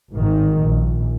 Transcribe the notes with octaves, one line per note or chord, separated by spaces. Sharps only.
G#1 D#3
A#1